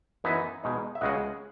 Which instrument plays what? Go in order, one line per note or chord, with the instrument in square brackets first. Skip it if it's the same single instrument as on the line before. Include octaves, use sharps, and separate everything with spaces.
[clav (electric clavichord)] F#2 E3 B3 D#4 E5 G#5
B2 G#3 D#4
E5
C#2 C#3 G#3 D#5 F#5